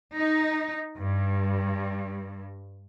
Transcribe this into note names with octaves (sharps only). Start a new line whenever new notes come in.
D#4
G2